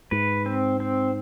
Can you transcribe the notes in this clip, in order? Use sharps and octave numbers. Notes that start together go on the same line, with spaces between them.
G#2 B4
C4
C4